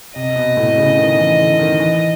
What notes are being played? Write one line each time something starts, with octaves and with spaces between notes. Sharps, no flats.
C3 D#5
B2
A2
C#3
D#3
E3
D3
D#3
E3